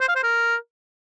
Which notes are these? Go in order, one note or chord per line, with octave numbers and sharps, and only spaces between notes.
C5
F5
C5
A#4